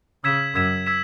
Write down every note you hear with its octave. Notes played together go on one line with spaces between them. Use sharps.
C#3 E6 G#6 B6 E7
F#2 E6 G#6 B6 E7
E6 G#6 B6 E7